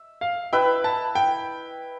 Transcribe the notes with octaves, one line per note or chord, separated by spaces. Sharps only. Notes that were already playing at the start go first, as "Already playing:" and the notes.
Already playing: E5
F5
E4 B4 E5 G5
A5
G5